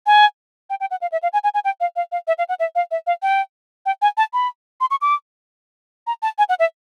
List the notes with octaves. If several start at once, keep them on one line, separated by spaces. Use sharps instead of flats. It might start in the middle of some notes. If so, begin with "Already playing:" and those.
G#5
G5
G5
F#5
F5
E5
F5
G#5
G#5
G#5
G5
F5
F5
F5
E5
F5
F#5
E5
F5
E5
F5
G5
G5
G#5
A5
B5
C6
C#6
D6
A#5
A5
G#5
F#5
E5